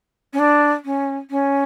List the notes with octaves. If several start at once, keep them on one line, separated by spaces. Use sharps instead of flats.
C#4
D4
C#4
C#4